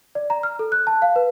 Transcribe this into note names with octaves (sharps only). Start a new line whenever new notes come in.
D5
A#5
F6
A4
F#6
A5
F5
B4